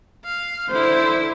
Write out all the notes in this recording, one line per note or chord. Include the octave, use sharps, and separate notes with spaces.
F5
D3 E4 C5